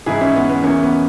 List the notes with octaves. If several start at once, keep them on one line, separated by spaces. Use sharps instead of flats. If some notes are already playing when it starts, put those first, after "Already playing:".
G#2 E3 E4 G#4
C#4 E4
B3
B3
E2 C#3 E3 A#3 C#4
B3